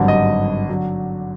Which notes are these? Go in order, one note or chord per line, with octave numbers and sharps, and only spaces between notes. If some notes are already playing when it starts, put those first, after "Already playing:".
Already playing: G#1 G2 D3 F#3
D#5
D3 F#3